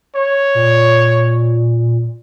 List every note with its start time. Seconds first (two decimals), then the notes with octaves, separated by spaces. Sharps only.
0.16 C#5
0.55 A#2